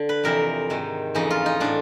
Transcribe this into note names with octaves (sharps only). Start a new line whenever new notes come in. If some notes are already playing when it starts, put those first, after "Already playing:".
Already playing: D3
B4
F2 C3 E3 A#4
G#2 D#3
F2 C#3 E3 D#4
F4
D#4
A2 E3 D4